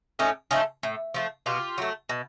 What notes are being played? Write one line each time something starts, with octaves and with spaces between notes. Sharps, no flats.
A2 C#4 D#4
F3 A3 C#4 D#4
A2
F3 A3
B2 F4 G4
F#3 A3
B2